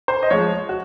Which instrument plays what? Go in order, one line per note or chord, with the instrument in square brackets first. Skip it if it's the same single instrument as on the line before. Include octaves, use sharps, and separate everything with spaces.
[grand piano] C5
D#5
F3 G#3 C#5
F#4